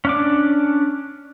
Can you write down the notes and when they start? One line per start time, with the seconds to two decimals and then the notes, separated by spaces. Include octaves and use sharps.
0.05 C#4 D4 D6